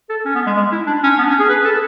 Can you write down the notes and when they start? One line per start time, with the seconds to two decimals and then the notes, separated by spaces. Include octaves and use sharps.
0.10 A4
0.25 C#4
0.35 B3
0.47 G#3
0.57 G#3
0.72 E4
0.87 D4
1.03 C#4
1.19 B3
1.25 D4
1.29 C#4
1.40 G#4
1.49 B4
1.65 A4